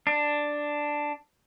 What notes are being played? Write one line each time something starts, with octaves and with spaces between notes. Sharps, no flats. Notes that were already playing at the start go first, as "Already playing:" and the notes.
D4